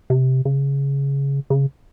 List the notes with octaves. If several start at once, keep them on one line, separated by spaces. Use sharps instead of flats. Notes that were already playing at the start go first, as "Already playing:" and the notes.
C3
C#3
C#3